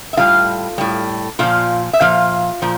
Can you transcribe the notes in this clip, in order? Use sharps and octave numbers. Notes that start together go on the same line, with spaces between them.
E5
A2 G3 F4 F5
A2 G3
A#2 F3 F4 F5
E5
A#2 F3 F4 F5
A#2 F3